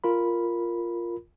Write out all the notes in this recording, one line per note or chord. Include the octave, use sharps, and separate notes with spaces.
F4 A#4 B5